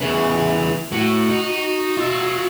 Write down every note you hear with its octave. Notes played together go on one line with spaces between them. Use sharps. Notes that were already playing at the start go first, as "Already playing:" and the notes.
E2 C#3 B4 E5
A2 F#4
D#4
F4 E5